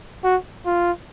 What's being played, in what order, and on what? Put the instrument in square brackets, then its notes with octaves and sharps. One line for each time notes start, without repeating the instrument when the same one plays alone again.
[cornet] F#4
F4